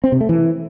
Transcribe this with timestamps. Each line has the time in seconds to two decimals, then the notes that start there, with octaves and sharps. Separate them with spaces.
0.04 C4
0.12 C3
0.21 A3
0.29 E3